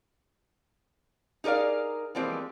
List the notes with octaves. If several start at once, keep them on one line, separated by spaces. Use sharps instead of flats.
D#4 G#4 A#4 D5 F5
E3 F3 G3 G#3 A#3 C4